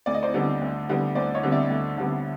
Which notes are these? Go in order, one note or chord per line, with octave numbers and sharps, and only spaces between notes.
D2 D5
D#5
C5 D5
D3 G3 B3
D2
D3 G3 B3
D2 C5 D5
C#5 D#5
D3 G3 B3
D5 E5
D2
D3 G3 B3